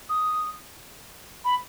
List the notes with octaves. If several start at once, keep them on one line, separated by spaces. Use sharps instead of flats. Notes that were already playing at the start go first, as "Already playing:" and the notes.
D#6
B5